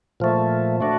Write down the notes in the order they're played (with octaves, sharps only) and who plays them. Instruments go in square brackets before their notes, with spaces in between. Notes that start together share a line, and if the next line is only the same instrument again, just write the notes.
[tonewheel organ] A#2 F3 A3
A3 D4 F#4